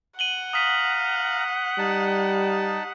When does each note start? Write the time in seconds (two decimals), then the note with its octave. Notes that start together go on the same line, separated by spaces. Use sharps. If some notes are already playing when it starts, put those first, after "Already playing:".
0.19 F#5 D#7 F#7 G7
0.53 F5 A#5 D#6 B6 D#7
1.78 G3 D#4 A5